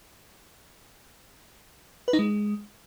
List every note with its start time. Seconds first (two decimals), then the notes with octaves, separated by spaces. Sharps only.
2.08 B4
2.13 D#4
2.19 G#3